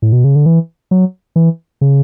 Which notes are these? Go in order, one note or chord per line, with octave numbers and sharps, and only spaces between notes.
A2
B2
C#3
D3
E3
F#3
E3
C#3